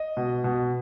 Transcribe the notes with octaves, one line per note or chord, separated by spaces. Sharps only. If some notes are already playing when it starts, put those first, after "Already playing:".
Already playing: D#5
B2
B2